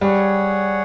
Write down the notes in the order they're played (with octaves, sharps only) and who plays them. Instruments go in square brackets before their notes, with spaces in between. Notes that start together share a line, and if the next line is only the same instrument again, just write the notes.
[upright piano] G3 [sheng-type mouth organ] G#4 C#5 F#5